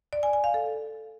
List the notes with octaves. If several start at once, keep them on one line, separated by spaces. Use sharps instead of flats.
D5
G#5
G#5
F5
A4